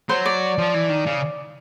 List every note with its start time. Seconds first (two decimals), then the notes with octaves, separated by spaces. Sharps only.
0.09 F#3 C5
0.26 D5
0.58 F3
0.74 E3
0.89 D#3
1.06 C#3